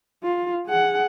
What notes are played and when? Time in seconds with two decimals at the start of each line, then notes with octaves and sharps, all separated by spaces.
0.23 F4
0.67 G#4 F#5